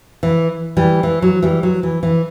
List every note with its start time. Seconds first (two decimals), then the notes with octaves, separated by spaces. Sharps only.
0.23 E3
0.77 E3 G3
1.03 E3
1.22 F#3
1.42 E3 G3
1.63 F#3
1.83 E3
2.03 E3